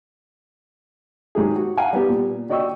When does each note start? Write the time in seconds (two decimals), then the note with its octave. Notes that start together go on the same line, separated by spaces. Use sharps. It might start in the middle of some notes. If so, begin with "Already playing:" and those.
1.35 G#2 F#3 G4 G#4
1.56 F#4
1.77 F5 F#5 G#5 A#5
1.93 G3 B3 G4
2.09 A#2
2.50 F#4 D5 D#5 G5 C#6 E6